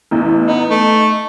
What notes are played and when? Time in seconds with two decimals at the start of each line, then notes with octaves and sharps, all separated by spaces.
0.11 A1 E2
0.48 B3 D#4
0.70 A3